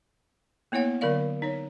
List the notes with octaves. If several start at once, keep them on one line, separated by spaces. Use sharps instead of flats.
A#3 B3 E4 C#5 F#5
D3 F#3 A#4 D5 F5
D#4 C#5